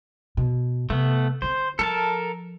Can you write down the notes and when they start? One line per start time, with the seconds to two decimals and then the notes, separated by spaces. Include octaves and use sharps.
0.37 B2
0.90 C3 A3 B3
1.42 D3 C4 C5
1.79 F3 A4 A#4 A5